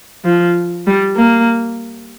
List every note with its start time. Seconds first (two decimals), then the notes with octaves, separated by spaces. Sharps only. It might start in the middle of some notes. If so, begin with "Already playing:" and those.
0.25 F3
0.87 G3
1.17 A#3